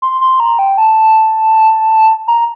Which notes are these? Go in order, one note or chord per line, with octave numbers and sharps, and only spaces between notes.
C6
C6
A#5
G5
A5
A#5